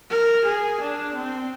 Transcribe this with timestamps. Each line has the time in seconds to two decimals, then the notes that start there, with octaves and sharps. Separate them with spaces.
0.11 A#4
0.45 G#4
0.81 D4
1.15 C4